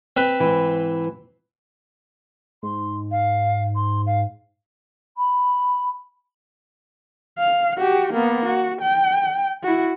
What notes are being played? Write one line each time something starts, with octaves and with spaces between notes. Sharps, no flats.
C4 B4
G#2 E3
G#2 C6
F5
C6
F5
B5
F5
F#4 G4
A#3 B3
F#4
G5
E4 F#4